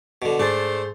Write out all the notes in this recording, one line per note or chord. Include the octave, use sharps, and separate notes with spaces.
B2 D3
G#2 A3 D4 G#4 C5 A6